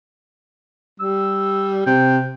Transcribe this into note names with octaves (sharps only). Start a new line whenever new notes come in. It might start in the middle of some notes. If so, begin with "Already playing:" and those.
G3 E6
C3 G5